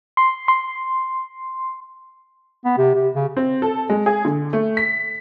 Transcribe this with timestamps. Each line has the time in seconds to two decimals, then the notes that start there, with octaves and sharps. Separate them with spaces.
0.17 C6
0.48 C6
2.65 B3
2.78 C3
2.95 C3
3.15 C#3
3.37 C4
3.62 A4
3.90 G#3
4.06 G#4
4.25 D3
4.53 A3
4.77 B6